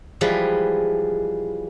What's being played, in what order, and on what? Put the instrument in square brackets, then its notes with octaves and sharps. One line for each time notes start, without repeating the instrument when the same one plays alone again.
[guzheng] E3 F3 G3 G#3 B4